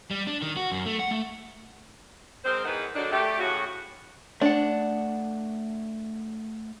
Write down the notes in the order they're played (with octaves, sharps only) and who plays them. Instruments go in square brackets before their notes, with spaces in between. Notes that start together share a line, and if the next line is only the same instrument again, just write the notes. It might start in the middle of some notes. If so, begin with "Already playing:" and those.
[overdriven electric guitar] G3
D4
D#3
F#4
F#2
A3
F#5
A3
[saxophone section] G#3 C4 A#4 C5
E2 D#3 B4 F#5
D3 D#3 F#3 D4
A3 G4
A2 C#3 F#4
[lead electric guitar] A3 F#5 [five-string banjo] D4